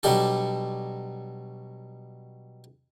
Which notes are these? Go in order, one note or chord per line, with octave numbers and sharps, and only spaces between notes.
B2 F#3 G3 D4 G4 A4